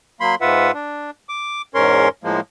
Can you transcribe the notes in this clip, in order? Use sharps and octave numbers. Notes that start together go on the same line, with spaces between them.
F#3 A#3 B5 C6
G#2 F4 B4 E5 F#5
D4
D6
E2 G#2 C#4 A#4 C#5 C6
A2 F3 G#3 A#3